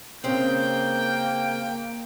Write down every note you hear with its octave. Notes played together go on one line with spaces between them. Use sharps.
C#3 A#3 C4 G5